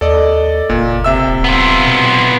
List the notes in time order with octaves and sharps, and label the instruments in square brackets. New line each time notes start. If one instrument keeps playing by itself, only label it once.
[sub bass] D#2 [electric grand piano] A4 D5 D#5
[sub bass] F#1 [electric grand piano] A#2
[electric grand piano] C3 E5 E6
[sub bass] D1
[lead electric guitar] B3 F4
[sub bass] B2